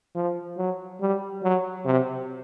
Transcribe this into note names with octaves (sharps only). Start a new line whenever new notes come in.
F3
F#3
G3
F#3
C3